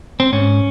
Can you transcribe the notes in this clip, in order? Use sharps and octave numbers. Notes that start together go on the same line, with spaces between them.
C4
G#2 C#4